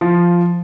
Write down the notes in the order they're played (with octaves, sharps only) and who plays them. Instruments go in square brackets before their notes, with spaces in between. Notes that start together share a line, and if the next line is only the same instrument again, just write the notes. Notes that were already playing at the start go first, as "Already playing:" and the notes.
[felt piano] F3